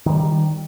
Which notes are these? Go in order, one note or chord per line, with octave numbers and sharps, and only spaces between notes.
D#3 E3 G3